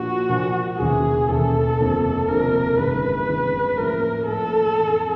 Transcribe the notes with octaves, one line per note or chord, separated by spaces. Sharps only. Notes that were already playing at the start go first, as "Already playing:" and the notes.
Already playing: A#2 F3 A#3 D4 F4 F#4
A#2 F3 A#3 D4 F4
E1 D#2 C#3 E3 G#4
E1 D#2 C#3 E3 A4
F1 F2 D3 F3 A#3
F1 F2 D3 F3 A#3 A#4
G1 F#2 D#3 G#3 B4
G1 F#2 D#3 G#3
A2 F3 A#3 C#4 A#4
A2 F3 A#3 C#4 A4
F2 C3 E3